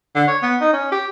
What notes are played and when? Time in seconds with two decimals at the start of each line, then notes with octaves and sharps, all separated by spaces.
0.15 D3
0.28 C#5
0.42 B3
0.61 D#4
0.73 C#4
0.92 G4